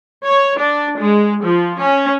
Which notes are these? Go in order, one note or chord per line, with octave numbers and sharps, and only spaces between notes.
C#5
D4
G#3
F3
C#4